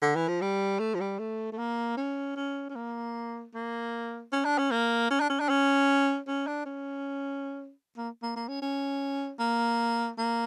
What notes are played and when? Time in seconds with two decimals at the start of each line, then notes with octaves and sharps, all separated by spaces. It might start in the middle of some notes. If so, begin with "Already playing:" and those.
0.02 D3
0.15 E3
0.28 F3
0.41 G3
0.80 A3
0.94 F3
1.00 G3
1.19 A3
1.52 A3
1.58 A#3
1.97 C#4
2.36 C#4
2.69 C#4
2.75 A#3
3.54 A#3
4.32 C#4
4.45 D4
4.58 C#4
4.71 A#3
5.10 C#4
5.20 D4
5.29 C#4
5.40 D4
5.49 C#4
6.28 C#4
6.47 D4
6.66 C#4
7.97 A#3
8.22 A#3
8.36 A#3
8.48 C#4
8.62 C#4
9.39 A#3
10.18 A#3